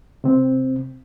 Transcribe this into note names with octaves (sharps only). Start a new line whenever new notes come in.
C3 C4